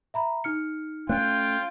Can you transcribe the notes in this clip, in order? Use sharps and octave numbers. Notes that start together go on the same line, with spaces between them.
E5 A#5 B5
D#4 F6 C#7
A3 C#4 F4 G5 F#6